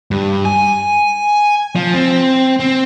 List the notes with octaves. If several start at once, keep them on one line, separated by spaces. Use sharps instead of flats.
G2
G#5
F3
C4
C4